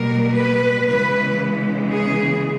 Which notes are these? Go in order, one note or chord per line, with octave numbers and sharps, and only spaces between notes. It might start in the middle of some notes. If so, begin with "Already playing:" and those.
Already playing: B2 G3 A#3 A#4
B4
C#3 E3 G#3 B3 B4
G#4